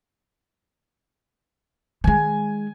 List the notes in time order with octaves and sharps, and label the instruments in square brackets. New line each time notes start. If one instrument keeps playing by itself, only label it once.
[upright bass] D#3 G#3 [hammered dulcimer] G#5